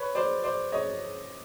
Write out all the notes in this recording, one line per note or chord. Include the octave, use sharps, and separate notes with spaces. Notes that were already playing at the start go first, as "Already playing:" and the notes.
Already playing: B4 C#5
C5 D5
C5 D5
C#5 D#5